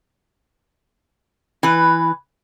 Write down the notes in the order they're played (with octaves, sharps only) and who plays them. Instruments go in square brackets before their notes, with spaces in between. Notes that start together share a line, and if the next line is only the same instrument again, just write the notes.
[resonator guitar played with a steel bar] E3 B4